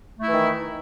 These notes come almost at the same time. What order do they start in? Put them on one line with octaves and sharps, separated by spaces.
A3 E4 E3 D#3